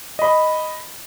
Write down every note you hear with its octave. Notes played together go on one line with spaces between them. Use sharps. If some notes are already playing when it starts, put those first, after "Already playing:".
D#5 B5